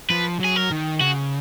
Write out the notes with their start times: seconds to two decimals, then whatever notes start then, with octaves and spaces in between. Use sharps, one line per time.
0.10 F3 B4
0.40 F#3 G#4
0.56 A#4
0.71 D#3
1.01 C#3 F#4